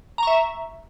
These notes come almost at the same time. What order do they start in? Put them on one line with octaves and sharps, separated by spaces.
A#5 C#6 E5